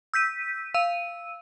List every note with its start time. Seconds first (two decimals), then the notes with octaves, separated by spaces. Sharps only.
0.14 E6 G6 B6 D#7
0.74 F5 E6 D#7